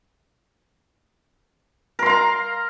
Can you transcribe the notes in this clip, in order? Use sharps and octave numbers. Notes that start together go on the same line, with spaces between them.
A#4 F5 A#5 C6